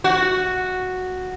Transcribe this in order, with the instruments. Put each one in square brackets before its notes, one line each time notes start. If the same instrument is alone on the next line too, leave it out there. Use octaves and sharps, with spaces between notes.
[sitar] F#4